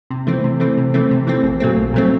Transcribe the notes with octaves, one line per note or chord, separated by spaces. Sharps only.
C3
E3 A3 C4
C3
E3 A3 C4
C3
E3 A3 C4
C3
E3 A3 C4
A#1
A#2 F#3 A3 C4
A#1
A#2 F#3 A3 C4